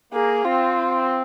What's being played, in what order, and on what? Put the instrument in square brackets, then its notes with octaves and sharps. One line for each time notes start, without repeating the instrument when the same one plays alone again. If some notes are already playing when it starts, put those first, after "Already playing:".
[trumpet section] A#3 [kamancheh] G#4
[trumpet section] C4 [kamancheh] F4